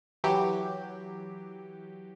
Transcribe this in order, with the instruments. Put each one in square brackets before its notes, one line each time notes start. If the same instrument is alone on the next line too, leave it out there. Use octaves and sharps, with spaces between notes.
[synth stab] E3 F#3 G4